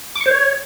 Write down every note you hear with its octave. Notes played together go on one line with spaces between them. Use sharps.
D6
C#6
C5
C#5